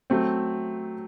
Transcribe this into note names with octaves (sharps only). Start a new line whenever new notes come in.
F#3 A3 C4